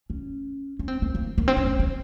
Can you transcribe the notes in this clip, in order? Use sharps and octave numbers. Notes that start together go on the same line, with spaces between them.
C#4
C#4
C4
A#3
A#3
A#3
C4
C#4
C4
C4